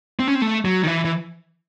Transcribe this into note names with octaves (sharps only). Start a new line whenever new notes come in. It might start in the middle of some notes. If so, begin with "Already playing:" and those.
C4
C#4
C4
A3
F#3
D#3
E3
E3